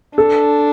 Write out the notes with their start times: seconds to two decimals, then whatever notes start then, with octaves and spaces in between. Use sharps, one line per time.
0.18 D4 A4